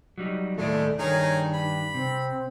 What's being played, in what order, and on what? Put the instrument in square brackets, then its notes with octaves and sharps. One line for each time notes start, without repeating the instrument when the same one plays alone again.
[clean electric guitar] F#3 G3 D#4
[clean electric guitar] D#2 A2 D5 [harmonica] G#3 [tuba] A3
[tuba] G2 [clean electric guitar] D#3 [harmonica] D#4 G#4 A#4 [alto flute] C#5
[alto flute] D4 [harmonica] B5
[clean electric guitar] C3 [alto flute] C4